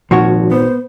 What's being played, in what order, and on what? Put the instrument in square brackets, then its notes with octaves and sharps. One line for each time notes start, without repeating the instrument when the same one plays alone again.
[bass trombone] G#1 [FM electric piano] A#2 [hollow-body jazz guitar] F3 F#4 C#5
[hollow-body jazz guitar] B3 [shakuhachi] C5